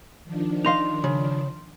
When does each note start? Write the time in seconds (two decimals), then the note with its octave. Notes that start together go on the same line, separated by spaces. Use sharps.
0.24 D#3 F3 D4
0.65 D#4 D#5 F5 C6 F7
1.04 C#3